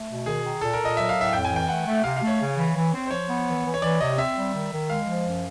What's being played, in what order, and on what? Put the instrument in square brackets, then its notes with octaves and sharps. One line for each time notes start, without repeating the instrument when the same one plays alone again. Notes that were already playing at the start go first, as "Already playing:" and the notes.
Already playing: [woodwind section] A3
B2
[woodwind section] D#3 [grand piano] G#4
[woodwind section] D#3
[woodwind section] A#2 [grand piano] A4
[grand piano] A#4
[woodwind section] A#2 [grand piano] D#5
[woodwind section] F#3 [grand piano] E5
[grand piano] F5
[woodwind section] A2
[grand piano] E5
[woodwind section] F2 [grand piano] G5
[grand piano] G#5
[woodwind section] E3
[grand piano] G5
[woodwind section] A3 [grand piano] F#5
[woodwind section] A3
[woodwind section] C3 [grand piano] F5
[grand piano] F5
[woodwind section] A3
[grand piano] C#5
[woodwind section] C#3
E3
E3
C4
[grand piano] C5
[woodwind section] F3 [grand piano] C#5
[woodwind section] B3
E3
E3
[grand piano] C#5
[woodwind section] E3 [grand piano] D5
[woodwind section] C3 [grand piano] D#5
[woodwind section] C4 [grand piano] E5
[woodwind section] G3
D#3
D#3
[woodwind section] G#3 [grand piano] F5
[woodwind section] F3
F#2